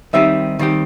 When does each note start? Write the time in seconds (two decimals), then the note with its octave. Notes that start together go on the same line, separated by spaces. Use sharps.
0.13 D#3 G3 C4 D#4 G4 E5
0.59 D#3 G3 C4 D#4 G4